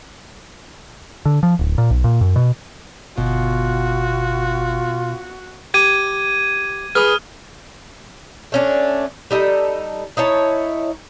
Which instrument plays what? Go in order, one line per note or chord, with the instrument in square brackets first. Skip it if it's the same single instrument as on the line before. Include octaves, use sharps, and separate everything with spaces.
[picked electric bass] D3
F3
D1
A#2
B1
A#2
F#2
B2
[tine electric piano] G1 [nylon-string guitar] B2 [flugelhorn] F4 [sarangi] F#4
[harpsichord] G4 [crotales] G#6 D#7
[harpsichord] G#4 B4 [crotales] D#6 F6
[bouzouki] A3 C#4 D4
G3 D#4 A4
D#4 E4 C#5 A5